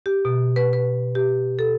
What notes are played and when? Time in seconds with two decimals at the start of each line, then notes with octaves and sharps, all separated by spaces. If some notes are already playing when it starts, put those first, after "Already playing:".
0.06 G4
0.25 B2
0.56 B4
0.73 B4
1.15 G4
1.59 A4